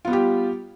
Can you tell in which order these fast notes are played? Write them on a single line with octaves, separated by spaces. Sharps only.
F4 B3 G3 G4